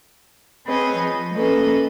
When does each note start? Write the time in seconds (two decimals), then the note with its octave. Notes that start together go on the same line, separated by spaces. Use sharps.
0.65 C4 G#4 B4 C#5 D#5
0.96 F3
1.34 A#3 C#4 A4 B4 D#5